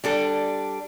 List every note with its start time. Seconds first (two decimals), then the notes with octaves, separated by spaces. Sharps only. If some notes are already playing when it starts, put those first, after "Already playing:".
0.04 G3 D4 A4